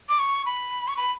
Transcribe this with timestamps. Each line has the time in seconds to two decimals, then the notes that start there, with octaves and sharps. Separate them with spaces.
0.09 D6
0.19 C#6
0.46 B5
0.88 C#6
0.97 B5